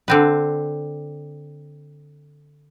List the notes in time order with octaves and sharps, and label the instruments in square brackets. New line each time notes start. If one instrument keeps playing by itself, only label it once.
[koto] D3 C4 B4